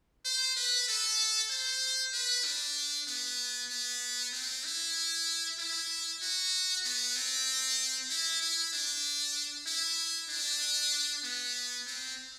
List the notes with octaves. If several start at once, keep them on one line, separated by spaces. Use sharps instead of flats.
C5
B4
A4
C5
B4
D4
B3
B3
C4
E4
E4
F#4
B3
C4
E4
E4
D4
E4
D4
B3
C4